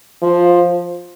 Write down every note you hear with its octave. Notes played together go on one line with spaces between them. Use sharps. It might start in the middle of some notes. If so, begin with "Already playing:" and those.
F3